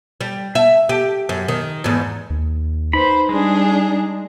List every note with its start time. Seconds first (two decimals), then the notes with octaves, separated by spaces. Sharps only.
0.21 G3
0.55 E5
0.89 G4
1.29 F#2
1.48 D#3
1.84 E2 G#2
2.30 D#2
2.93 D#4 B4 C5 B5
3.29 G3 G#3 D4 G#4